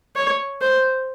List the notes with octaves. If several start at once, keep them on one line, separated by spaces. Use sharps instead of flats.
C#5
C5